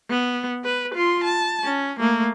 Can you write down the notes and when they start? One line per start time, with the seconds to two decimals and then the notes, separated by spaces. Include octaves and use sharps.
0.10 B3
0.64 B4
0.94 F4 C6
1.24 A5
1.64 C#4
1.99 A3 A#3